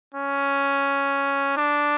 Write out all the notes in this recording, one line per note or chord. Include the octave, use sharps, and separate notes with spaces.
C#4
D4